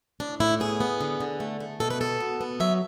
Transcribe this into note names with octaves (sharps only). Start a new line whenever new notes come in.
A2 D4
A2 E4
B3 G#4
B3
D3
D3
A3
A3
B2 A4
B4
B3 A4
B2
B3
F#3 E5